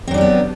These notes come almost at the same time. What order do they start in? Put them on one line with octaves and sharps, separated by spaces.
C4 F#3 D4 G3 B3